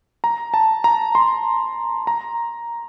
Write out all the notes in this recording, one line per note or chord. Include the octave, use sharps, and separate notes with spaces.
A#5
A5
A#5
C6
A#5